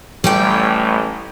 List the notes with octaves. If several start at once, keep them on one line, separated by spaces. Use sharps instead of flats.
A1 G3 A3 G5